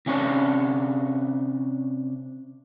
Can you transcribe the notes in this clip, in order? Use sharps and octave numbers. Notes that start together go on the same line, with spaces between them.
C3 C#4 D4 C#5 A5